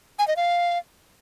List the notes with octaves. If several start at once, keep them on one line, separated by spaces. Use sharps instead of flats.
G#5
D#5
F5